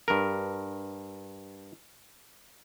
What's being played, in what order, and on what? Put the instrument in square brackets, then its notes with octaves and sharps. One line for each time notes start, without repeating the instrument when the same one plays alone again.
[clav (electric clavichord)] G2 A#4